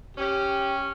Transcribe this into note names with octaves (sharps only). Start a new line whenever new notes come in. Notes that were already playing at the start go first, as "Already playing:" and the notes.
C#4 G4